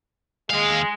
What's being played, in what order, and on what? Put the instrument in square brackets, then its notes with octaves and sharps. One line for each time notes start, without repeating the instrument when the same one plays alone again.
[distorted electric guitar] D#2 F5 [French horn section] G#3